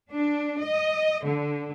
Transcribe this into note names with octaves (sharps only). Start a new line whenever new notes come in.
D4
D#5
D3